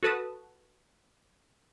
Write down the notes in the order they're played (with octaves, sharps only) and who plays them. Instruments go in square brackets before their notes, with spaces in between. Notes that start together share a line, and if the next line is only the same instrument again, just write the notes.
[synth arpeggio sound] F#4 A4 B4 A5 D#6